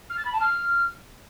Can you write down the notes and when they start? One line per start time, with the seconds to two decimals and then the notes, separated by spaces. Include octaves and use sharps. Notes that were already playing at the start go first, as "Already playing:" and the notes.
0.10 F6
0.17 A6
0.25 B5
0.33 A5
0.41 F6